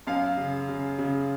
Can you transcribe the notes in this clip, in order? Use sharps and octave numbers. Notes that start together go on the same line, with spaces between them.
F#2 F5
C#3
C#3
C#3